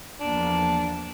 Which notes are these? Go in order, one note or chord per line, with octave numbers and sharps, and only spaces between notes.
E2 F3 A#3 D4